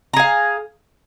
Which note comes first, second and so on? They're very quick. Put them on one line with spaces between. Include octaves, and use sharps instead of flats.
A#5 G#4 F5